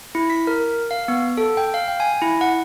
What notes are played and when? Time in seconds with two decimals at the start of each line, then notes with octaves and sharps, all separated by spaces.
0.15 E4
0.30 B6
0.47 A#4
0.91 F5
1.08 B3
1.37 A4
1.57 G5
1.74 F5
1.88 G5
2.00 G#5
2.22 E4
2.41 F#5